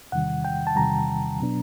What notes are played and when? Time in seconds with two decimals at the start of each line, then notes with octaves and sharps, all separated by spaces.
0.12 E2 C3 D#3 G3 F#5
0.45 G5
0.67 A5
0.76 E2 C3 D#3 G3 A#5
1.40 B2 F#3 B3 D4